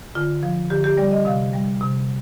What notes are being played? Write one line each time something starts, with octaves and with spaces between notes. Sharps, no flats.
D3 F4
F3
D3 G4
G4
G3 D5
D#5
C3 F5
G3
C3